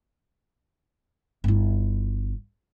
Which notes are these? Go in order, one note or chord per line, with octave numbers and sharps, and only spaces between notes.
G1 E4